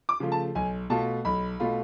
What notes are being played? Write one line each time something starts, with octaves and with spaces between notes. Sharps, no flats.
D6
C#3 F3 A3 F4
A5
B1 G#5
B2 A3 F4 A5
B1 B5
B2 A3 F4